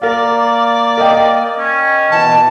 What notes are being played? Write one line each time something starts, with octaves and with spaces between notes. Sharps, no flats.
A#3 A#4 D5 F5
A#4 D#5 G5
C#4
B2 E3 A5